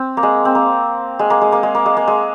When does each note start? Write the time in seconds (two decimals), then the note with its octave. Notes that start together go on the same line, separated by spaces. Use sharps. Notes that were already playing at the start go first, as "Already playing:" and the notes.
Already playing: C4
0.17 A#3
0.23 G#3
0.45 C4
0.55 A#3
1.19 G#3
1.30 A#3
1.41 G#3
1.52 A#3
1.63 G#3
1.75 A#3
1.86 G#3
1.97 A#3
2.08 G#3